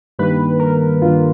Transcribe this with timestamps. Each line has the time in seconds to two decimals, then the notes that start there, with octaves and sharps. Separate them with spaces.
0.19 G2 D#3 G3 A#3 B4
0.59 A#4
1.02 G2 D#3 G3 A#3 F4